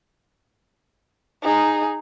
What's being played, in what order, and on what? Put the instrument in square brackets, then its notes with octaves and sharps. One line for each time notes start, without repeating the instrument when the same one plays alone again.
[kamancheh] D#4 G#4